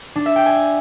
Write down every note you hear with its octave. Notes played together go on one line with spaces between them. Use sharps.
D4
E5
G5
G#5